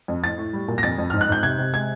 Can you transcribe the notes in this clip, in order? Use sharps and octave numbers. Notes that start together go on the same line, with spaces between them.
F2
A2 A6
A2
G3
A#2
A#6
F2 A6
F2
G#2 F6
F#6
G#2 G6
C3 G#6
C3
G#3 G#6